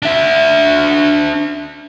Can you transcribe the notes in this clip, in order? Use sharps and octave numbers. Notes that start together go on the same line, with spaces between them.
D4 E5